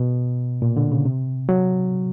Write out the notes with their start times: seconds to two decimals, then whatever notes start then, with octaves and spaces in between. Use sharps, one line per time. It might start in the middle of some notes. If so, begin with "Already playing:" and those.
Already playing: B2
0.62 A#2
0.76 D3
0.92 C#3
1.05 C3
1.49 F#3